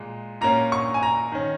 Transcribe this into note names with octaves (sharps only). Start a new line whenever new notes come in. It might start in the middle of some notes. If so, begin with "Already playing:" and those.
Already playing: A#2 G#3
A#2 A#3 C#4 A#5
C#6
G#5
A#5
D#3 C#4